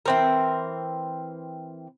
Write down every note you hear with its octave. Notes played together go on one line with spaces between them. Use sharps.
E3 C4 A#4